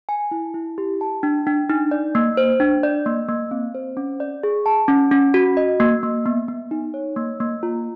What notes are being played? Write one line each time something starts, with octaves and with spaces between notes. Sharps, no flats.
G#5
E4
E4
G4
A5
D4
D4
D#4
D5
A#3
C5
D4
D5
A#3
A#3
C4
C5
C#4
D5
G#4
A5
C#4
C#4
F#4
D#5
A#3
A#3
B3
B3
D#4
C#5
A#3
A#3
F4